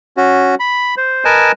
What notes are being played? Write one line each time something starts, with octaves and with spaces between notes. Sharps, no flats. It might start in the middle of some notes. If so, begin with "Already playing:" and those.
C#4 F#4
B5
C5
A#4 B4 D#5 G#5 A5